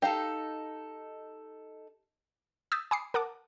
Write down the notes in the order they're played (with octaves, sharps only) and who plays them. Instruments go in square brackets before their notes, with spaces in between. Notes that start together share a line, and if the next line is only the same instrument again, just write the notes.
[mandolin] D#4 A4 [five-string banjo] G4 F5
[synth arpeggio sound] D#6 E6 G6 A6 B6
G#5 B5 D6 D#6 C7 C#7
A#4 F#5 A5 D6